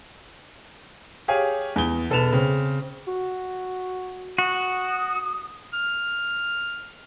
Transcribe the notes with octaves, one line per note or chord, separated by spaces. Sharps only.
G4 G#4 C#5 F5 G#5
E2 G7
E1 A4 B4 E7 F7
C#3 C4
F#4
F#4 D#6
F6